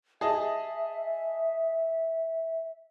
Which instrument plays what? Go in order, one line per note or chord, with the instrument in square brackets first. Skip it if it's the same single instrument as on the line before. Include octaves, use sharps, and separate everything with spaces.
[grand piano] G#4 D#5 A5 [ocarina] E5